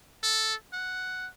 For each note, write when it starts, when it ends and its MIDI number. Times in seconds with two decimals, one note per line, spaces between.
0.23 0.54 69
0.73 1.28 78